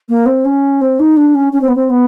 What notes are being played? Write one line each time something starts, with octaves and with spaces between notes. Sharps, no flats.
A#3
C4
C#4
C4
D#4
D4
C#4
C#4
C4
B3
C4
B3